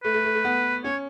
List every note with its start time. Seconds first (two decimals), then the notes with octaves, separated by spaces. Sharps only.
0.04 A3 B4
0.14 A3
0.25 A3
0.35 A3
0.44 B3
0.84 C#4 C#5